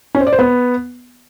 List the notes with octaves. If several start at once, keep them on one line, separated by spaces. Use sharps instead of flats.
C#4
C5
D5
C5
B3